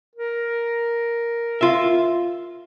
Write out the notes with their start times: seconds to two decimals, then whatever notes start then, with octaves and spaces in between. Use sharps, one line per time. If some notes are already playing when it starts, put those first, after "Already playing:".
0.15 A#4
1.61 F4 E5